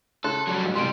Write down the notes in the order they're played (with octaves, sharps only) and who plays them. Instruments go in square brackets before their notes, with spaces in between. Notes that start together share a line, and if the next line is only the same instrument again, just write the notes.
[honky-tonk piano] C#3 C6 F#6 [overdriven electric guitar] A4
[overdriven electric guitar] F#3 G3
[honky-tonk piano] A1 G2
[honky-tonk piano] A1 [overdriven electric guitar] C3 G3 [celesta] C6 D7